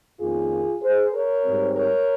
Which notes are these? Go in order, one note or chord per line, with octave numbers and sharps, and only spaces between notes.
F2 D#3 A#3 C#4 F4 G#4
G#4 C5
A#4 C#5
G#2 G3 C4
A#4 C#5